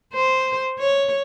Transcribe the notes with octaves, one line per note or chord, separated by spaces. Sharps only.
C5
C#5